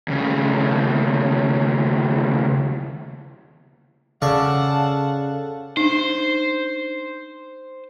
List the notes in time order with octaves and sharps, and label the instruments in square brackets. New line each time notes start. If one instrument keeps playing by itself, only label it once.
[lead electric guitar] D#2 C#3
[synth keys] C#3 A4 [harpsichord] D5 F5 C#6 [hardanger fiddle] F#5 A5
[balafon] D4 D#4 [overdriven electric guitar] C5